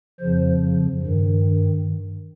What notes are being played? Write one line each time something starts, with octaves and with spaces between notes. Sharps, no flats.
F2 C#3 F3 C5
G2 D#3